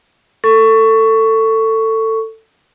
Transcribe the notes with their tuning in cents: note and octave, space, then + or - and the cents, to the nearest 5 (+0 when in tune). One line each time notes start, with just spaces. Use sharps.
A4 +20 C#6 +10